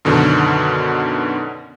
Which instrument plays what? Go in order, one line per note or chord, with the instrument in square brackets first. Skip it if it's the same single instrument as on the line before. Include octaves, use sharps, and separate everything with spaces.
[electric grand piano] F#2 B2 D3 D#3